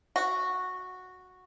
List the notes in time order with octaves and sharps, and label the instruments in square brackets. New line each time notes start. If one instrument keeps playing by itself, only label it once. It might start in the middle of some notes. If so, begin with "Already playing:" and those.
[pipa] F#4